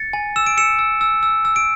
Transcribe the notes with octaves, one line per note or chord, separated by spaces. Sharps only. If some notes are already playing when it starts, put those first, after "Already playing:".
Already playing: A6 C#7
G#5
E6 E7
D7
E6 C#7 E7
E6
E6
E6
E6
D7